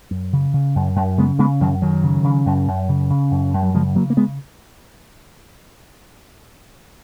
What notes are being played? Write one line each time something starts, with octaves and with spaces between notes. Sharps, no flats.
F#2
C#3
C#3
F#2
F#2
C#3 G#3 B3
C#3 G#3 B3
F#2 D#3 F#3
F#2 D#3 F#3
C#3
C#3
F#2
F#2
C#3
C#3
F#2
F#2
F#3
C#3 F3 G#3
C#3 F#3 A#3
A#3
G#3 B3